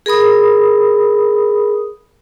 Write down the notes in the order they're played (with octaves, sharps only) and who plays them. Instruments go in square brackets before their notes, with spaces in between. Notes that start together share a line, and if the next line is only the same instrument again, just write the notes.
[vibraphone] G#4 A#4 B5 D#6